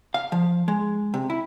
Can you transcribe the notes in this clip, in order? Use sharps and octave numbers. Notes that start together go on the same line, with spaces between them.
F5
F3
G#3
C3
E4